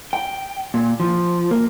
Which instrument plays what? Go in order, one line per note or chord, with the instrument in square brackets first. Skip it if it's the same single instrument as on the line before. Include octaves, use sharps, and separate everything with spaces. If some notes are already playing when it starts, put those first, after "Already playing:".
[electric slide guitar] G5
A#2
F3
A#3